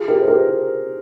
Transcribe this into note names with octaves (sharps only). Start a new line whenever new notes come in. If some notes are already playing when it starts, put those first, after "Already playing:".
Already playing: F4 G#4
G4 A#4
C5
G4 A#4